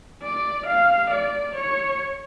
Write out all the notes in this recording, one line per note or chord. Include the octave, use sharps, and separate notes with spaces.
D5
F5
D5
C#5